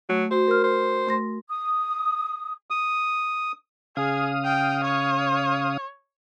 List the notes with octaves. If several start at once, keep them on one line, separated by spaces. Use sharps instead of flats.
F#3 A3
F#4 C5
A#4 F6
C5
A3 C6 A#6
D#6
D#6
C#3 G#4 F5 D#6
G5
C#5